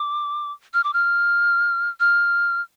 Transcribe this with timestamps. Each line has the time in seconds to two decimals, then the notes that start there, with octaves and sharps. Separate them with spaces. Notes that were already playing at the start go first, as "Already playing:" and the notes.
Already playing: D6
0.74 F6
0.84 D6
0.93 F6
2.00 F6